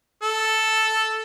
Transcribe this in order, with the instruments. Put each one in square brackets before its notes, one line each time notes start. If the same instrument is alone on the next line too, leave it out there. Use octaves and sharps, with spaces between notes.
[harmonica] A4